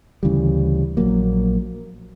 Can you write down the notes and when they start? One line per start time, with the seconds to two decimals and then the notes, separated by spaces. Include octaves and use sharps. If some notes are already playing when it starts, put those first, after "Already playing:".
0.23 D2 C#3 E3 G3
0.97 A#1 A#2 F#3 A#3